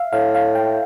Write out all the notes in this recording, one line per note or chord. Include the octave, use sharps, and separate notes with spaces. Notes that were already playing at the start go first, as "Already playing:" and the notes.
Already playing: E5 F5
A2 F5
F5
G5